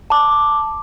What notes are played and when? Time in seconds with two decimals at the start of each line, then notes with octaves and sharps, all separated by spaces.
0.10 A5 D6